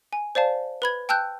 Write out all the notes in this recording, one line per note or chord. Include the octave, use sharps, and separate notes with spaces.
G#5
C5 D5 F5 A5
B4 B5 G#6
G5 A5 E6 F#6 G6